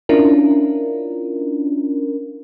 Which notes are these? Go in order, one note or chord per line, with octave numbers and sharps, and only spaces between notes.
C#4 D4 E4 F4 A#4